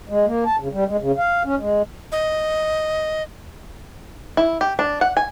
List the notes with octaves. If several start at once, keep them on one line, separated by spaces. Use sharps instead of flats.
G#3
A#3
A5
C#3
G3
G#3
C#3
F5
C#4
G#3
D#5
E4
G4
D4
F#5
G#5